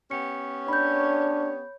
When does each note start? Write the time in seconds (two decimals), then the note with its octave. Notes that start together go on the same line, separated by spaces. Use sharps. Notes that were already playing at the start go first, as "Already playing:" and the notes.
0.11 B3 C#4 G4 C#7
0.68 D4 C#5 B5 G6